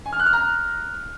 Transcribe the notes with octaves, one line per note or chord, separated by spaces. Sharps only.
G#5
F6
F#6
F6
A#5